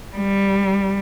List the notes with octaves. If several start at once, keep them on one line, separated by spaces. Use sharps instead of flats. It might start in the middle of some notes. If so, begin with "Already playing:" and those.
G3